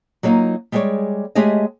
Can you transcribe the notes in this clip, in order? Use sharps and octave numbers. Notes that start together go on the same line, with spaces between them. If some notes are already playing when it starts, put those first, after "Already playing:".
F#3 G3 A#3 D4 D#4 F4
G3 G#3 G#4 A4 C#5 D5
G#3 A3 G4 G#4 C#5 D#5